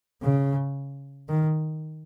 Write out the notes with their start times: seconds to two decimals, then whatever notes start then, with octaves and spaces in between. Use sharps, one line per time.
0.22 C#3
1.29 D#3